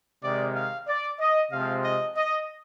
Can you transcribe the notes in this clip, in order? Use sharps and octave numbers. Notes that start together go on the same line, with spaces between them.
C3 D#3 G#3 C4 D5
F5
D5
D#5
C3 F3 G#3 C4 F5
D#5
D#5